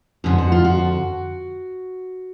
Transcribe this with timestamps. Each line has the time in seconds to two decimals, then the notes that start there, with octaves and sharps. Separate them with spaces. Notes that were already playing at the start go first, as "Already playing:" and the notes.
0.24 F2 D3 F3 G#4
0.38 F#4
0.52 F4
0.64 F#4